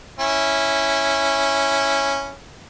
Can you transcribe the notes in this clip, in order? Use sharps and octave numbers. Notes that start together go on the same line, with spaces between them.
C#4 E4